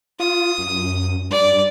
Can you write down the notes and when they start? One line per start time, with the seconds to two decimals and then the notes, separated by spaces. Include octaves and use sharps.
0.20 F4 D#6
0.58 F#2
1.31 G2 D5